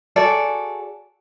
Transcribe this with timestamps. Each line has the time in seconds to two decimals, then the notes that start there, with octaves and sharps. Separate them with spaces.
0.16 F#4 G#4 A4 D5